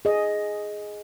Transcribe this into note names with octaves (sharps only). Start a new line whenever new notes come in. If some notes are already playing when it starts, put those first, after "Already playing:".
G#4 D#5